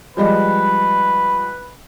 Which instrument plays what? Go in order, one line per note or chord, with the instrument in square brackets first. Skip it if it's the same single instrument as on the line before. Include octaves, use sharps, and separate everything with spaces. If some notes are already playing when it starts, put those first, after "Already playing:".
[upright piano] F3 G3 G#3 [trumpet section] B4